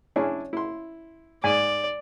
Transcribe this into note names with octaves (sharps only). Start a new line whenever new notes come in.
C#4 D4 E4 G#4
E4 C6
G#2 D5 G#5